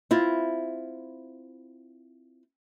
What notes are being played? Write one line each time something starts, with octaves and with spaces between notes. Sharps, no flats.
C4 E4 F4